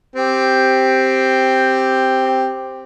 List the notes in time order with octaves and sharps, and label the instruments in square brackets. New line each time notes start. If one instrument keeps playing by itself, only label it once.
[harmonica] C4 G4 G5